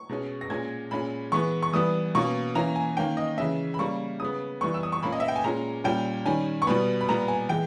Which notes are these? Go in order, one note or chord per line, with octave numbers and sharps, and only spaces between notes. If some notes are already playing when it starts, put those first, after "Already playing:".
Already playing: C#6
B2 G#3 C#4
A#6
A#2 G#3 C#4 G#6
A#2 G#3 C#4 B5
E3 G#3 B3 C#6
C#6
E3 G3 B3 D#6
B2 A#3 C#4 C#6
E3 A#3 C#4 A#5
G#5
D#3 A#3 C#4 G5
D#5
C#3 E3 G#3 C#4 E5
B5
C#3 G3 A#3 C#6
C#3 G#3 B3 D#6
E3 G3 B3 C#6
E6
D#6
C#6
A#2 A#3 C#4 B5
D#5
E5
G5
G#5
A#2 G#3 C#4 A#5
A#2 G3 C#4 G5
D#3 G3 C#4 G#5
C#6
B2 G3 B3 B5
B5
A#2 G3 B3 A#5
G#5
E3 G#3 G5